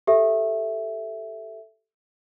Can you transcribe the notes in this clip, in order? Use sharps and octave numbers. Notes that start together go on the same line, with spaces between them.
G4 A4 E5